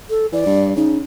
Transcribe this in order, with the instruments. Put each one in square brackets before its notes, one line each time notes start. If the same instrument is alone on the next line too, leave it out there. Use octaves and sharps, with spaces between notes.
[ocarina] A4
[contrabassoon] E3 [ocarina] D5
[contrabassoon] G2
[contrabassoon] C#3 [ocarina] D#4